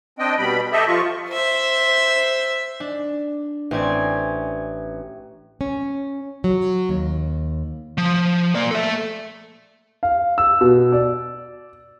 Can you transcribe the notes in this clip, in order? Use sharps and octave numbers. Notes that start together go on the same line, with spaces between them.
C4 D4 D#5 G5
B2 G3 B5
G4 A4 D#5 E5
F3 F4 C#6
C5 E5
D4
A1 C4 C#4 D5 G#6
C#4
F#3
D#2
F3
A#3 D5
A4 E5
F5
E6
B2
D5